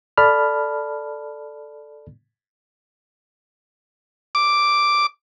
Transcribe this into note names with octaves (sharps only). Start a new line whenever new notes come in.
A4 D5 A5 B5 F6
D6